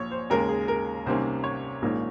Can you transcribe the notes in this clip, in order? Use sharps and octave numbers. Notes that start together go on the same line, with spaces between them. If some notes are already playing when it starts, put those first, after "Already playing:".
Already playing: A#1 A#2 F3 C#5
C5
D#2 C#3 G#3 C#4 A#4
G#4
A#4
C2 C3 D#3 A#3 C#4 C5
C#5
A#1 G#2 D#3 A#3 C#4